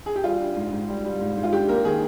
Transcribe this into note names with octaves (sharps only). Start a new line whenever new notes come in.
G#4
G4
G3 F4
D4
G#2
G#2
G3
G3
G#2
G#2
F4
D4 G4
A#3 A#4
D#3 G#4